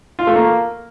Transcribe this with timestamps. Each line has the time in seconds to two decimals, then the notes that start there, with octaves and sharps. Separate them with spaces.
0.19 F4
0.27 A3
0.36 A#3